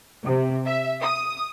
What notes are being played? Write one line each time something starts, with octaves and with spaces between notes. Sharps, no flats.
C3
E5
D#6